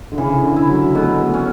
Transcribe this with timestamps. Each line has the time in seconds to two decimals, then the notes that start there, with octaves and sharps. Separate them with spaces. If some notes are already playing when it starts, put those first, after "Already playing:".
0.12 D3
0.18 C#3 E3
0.33 C#3
0.43 D3
0.56 E4
0.69 F#3
0.95 B2 A3
1.20 A3
1.34 C#4